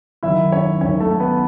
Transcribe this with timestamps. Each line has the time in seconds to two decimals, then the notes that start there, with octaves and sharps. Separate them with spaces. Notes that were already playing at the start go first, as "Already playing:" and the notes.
0.23 G#1 F#2 D#3 E4 E5
0.52 C#4 C#5
0.81 G#1 F#2 D#3 C#4 C#5
1.00 A3 A4
1.20 B3 B4